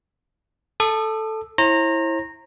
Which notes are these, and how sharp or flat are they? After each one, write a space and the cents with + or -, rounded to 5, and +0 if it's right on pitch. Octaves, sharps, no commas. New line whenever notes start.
A4 +0 D#6 -40
E4 +0 C5 +45 A#5 -10